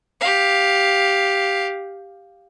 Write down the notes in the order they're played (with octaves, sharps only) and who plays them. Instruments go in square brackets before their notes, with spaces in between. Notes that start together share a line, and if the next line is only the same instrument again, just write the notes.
[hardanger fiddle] G4 F5